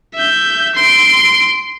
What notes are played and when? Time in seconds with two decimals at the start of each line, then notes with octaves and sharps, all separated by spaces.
0.14 E5 G6
0.75 C6 D7